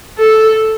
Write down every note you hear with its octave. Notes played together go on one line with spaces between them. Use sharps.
A4